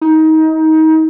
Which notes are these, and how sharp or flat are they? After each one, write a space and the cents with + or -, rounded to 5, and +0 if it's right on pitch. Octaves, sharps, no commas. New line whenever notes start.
D#4 +25